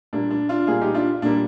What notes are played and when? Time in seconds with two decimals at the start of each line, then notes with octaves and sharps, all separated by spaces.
0.13 A#2 G3 A#3 D4
0.30 D4
0.49 D4 F4
0.67 A#2 G3 A#3 F4 G#4
0.81 D#4 G4
0.94 D4 F4
1.22 A#2 G3 A#3 D4